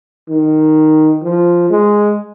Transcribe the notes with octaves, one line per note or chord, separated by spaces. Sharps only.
D#3
F3
G#3